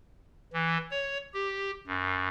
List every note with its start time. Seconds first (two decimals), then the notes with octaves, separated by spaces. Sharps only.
0.53 E3
0.91 C#5
1.34 G4
1.87 F#2